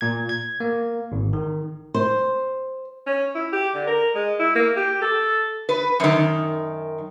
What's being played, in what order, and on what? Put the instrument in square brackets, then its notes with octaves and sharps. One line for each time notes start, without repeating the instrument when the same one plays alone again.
[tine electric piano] A#2 G#6
G#6
A#3
G#1
D#3
[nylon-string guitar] C5
[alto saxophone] C#4
E4
G4
D3
A#4
G#3
E4
A#3
G4
A4
[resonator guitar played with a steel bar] B4
F#2 D#3